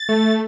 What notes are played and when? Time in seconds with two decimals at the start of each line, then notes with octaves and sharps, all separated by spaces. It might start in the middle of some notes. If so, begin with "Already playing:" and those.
Already playing: A6
0.09 A3